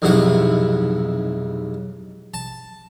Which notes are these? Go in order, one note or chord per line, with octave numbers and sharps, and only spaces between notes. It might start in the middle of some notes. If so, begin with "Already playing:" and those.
B1 F2 G#2 C3 E4 F#5
A5